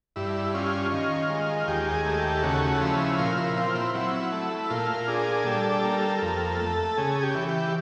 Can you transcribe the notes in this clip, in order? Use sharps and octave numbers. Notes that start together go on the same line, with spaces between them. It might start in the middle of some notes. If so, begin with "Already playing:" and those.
G2 E4
C#4 F4
D#3 F4
G#3
D#2 G4
G#4
A3
G4
C#3 F#4
F3 E4
A#2 F4
E4
C4 F4
E4
F#3 E4
A3
A#2 F4
D4 G#4
G3 A4
A#3
F2
A3
C#3 G#4
G4
E3
G4